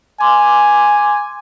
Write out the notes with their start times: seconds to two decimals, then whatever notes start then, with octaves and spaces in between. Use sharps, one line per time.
0.21 G#5 C6 D6